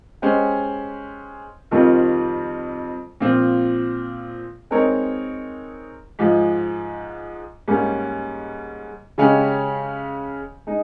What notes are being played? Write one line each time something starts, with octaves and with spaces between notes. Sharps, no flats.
G#3 C#4 G4 C5
F2 D#3 G3 C4 F4
A#2 F3 C4 F4
G#3 C4 D#4 A#4 C#5
G#2 F3 G#3
G#2 G3 A#3 C#4
C#3 G#3 C#4 G4
G#3 D#4